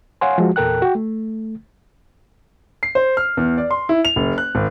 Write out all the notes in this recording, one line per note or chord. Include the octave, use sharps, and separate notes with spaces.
C#5 F5 F#5 G#5 C6
F3 G#3 F#4
E2 A#2 A4 A#4 G5 F#6
F#4 G5
A3
C7
C5
F6
E2
D5
C6
E4
F7
F#1
F#6
G#1